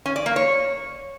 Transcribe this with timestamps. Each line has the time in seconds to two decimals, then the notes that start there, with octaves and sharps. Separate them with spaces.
0.06 C#4
0.16 D5
0.26 A#3
0.36 C#5